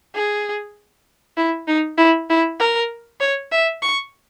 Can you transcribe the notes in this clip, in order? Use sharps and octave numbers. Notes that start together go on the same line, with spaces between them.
G#4
E4
D#4
E4
E4
A#4
C#5
E5
C#6